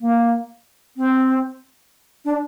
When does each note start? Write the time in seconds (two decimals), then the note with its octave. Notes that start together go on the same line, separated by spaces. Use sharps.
0.01 A#3
0.97 C4
2.25 D4